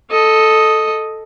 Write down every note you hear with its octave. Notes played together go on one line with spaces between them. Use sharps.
A4 D#5